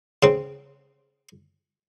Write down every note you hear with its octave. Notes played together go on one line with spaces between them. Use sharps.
C#3 C4